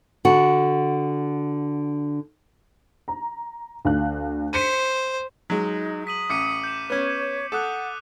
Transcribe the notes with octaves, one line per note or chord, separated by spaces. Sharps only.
D3 F#4
A#5
D2 F5 F#6
C5 B6 C#7 D#7
F#3 G#3 D#4
D#6 B6 D#7 F#7
A1 D6 C#7 D#7
G6 E7
B3 C#4 C#5
A4 F#5 D6 D#6 F#6